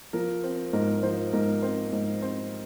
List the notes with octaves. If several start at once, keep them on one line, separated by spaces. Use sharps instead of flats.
F3 A#4
C4
G#2 A#4
F3 C5
G#2 A#4
C4 C5
G#2
C4 C5